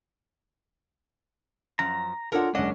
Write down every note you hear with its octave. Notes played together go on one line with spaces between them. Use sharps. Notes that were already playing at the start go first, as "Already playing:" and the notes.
F#2 F3 A#5
D4 F4 A4 A#4 C#5 F#5
F#1 G#3 C#4 D4 D#5 F#5